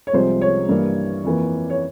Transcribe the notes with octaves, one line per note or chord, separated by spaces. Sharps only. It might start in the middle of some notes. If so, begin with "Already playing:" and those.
C#5
C2 C3 F3 G#3 C5
C#5
G2 E3 A#3
F2 E3 A#3
C#5